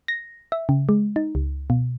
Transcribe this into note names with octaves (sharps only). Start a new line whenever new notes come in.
A#6
E5
C#3
G#3
D#4
C#2
B2